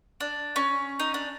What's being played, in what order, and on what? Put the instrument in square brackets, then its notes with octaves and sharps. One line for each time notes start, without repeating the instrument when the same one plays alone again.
[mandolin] D4
C#4
D#4
D4